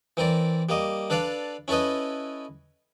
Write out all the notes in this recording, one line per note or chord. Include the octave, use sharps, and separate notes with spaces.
E3 C4 A#4 D5
G3 A#3 D#5
D4 A4 B4 D5 F5
C#4 E4 A4 B4 D#5